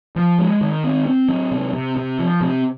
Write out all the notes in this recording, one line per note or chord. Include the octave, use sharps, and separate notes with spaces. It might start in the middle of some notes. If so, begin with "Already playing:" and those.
F3
G#3
D#3
C4
C4
F#3
C3
C3
C3
F3
C3